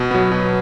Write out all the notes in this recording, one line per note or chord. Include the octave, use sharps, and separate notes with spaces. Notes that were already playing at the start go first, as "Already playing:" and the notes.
Already playing: B2
F#3 B3
B2